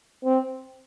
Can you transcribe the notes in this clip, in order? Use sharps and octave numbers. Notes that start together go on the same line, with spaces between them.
C4